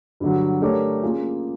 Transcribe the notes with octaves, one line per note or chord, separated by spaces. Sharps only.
G2 D3 F#3
A3 D4 G4 A#4 C#5
A#3 C#4 F4 G#4